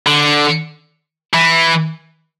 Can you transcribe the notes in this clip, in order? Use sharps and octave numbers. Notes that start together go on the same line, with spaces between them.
D3
E3